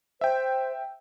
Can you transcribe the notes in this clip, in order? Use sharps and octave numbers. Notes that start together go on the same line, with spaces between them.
C5 E5 G5